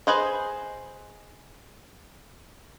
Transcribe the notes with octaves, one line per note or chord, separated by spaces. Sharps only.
G#4 B4 C5 D#5